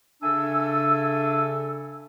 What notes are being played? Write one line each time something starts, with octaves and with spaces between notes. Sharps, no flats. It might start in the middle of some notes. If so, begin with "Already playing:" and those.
C#3 D4 A4 E5 G#5 E6